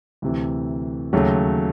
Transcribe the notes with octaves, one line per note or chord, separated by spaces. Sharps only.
D2 C3 E3
D#2 C#3 F#3 A3